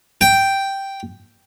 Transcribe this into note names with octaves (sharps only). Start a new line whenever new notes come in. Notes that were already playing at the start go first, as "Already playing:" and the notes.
G5